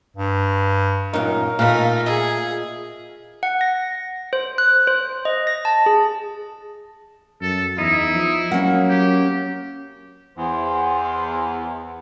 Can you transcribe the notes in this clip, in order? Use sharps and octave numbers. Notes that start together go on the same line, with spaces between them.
G2
F#2 A#2 D#4 A#4
A#2 A3 D#4 F5 B5
G#4 D#5 E5
F#5
A#6
C5
F#6
C5
D#5
A#6
A5
G#4
F#2 A4
E2 D#4 E4
F3
F#3 A#3 C#4 F#5
G4
E2 C5